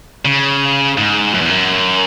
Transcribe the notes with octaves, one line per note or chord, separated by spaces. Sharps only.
C#3
G#2
F#2
E2
F#2